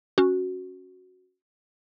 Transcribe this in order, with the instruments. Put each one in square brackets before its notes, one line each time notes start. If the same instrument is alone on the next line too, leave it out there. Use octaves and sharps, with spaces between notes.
[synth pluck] C#4 F#4